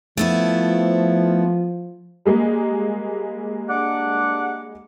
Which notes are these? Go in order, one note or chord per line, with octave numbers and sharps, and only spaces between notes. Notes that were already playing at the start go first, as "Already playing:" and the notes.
F3 A3 B3 E4
G3 G#3 A#3
D4 F#5 D6